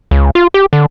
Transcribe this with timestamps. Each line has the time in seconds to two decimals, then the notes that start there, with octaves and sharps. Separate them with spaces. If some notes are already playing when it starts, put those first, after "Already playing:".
0.11 C#2
0.35 F4
0.54 G4
0.73 D3